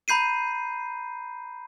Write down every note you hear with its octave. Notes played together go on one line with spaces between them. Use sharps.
A#5 B5 G6 C7 D#7